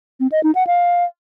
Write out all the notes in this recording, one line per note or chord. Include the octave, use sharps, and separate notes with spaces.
C4
D#5
D#4
F#5
F5